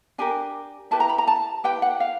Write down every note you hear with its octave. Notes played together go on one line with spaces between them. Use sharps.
D4 G4 A#4 G#5
E4 G4 B4 A5
A#5
B5
A#5
A5
E4 G4 B4 G5
F#5
F5